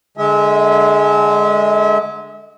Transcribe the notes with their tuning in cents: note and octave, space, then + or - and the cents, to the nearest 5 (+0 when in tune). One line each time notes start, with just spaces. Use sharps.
D3 +0 G#3 +0 E5 -35